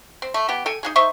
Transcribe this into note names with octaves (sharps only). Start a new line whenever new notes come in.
C4
A3
B3 G4
A4 G5 G#5
D#4 F#4 G#4
D#4 C5 E5 C#6